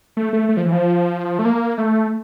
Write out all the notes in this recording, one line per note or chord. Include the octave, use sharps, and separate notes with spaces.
A3
A3
A3
F3
E3
F3
A3
A#3
A3